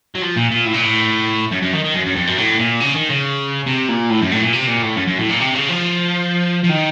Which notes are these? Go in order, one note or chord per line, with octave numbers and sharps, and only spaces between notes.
F#3
F3
A#2
A#2
A2
A#2
A2
F#2
F#2
D#3
D#3
F#2
F#2
F2
F#2
A2
A#2
C#3
D#3
C#3
C3
A#2
A2
F#2
A2
A#2
C3
A#2
A2
F#2
F#2
A2
A#2
C3
C#3
F3
F3
D#3